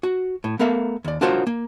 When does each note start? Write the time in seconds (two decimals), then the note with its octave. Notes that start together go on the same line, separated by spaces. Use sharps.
0.03 F#4
0.44 A2
0.59 A3 B3 A4 A#4 E5 F5
1.04 D#2 D5
1.21 D4 F4 F#4 A#4 C5 C#5
1.47 A#3